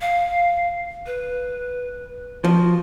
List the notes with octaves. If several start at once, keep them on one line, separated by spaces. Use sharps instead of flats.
F5
B4
F3 F#4